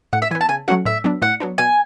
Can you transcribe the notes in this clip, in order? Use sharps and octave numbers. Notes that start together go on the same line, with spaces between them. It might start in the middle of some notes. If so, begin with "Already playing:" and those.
A2 F#5
E5
E3 B3 G#5
A5
C#3 G#5
F#3 A3 C#4 F#4 F#5
A2 E5
F#3 B3 D4
A2 F#5
F#3 B3 D4
B2 G#5